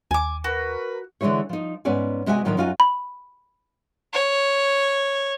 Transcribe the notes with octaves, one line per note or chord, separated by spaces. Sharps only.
D#2 G#5 D6
F#4 A#4 B4
D3 E3 F#3 G#3 E4 C#5
F3 D#4
G#2 B3 C#4 D5 G#5
C3 G#3 F#4 E5 G#5
A2 D#3 F3 F#3 A#3 D4
F#2 D#4 F4 F#4 G#5
B5
C#5